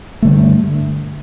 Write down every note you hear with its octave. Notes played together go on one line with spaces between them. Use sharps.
G2 D3 A3